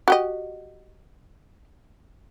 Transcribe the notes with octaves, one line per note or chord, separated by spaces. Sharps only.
F#4 G4 D#5